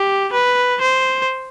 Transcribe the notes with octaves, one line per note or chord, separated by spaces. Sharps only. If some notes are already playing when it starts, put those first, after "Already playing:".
Already playing: G4
B4
C5